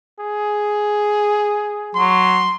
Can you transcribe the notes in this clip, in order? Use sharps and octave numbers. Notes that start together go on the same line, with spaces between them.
G#4
F#3 C6